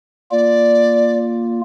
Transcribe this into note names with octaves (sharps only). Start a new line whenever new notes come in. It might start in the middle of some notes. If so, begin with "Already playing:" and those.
A#3 F4 D5